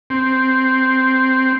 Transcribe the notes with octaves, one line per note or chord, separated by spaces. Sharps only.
C4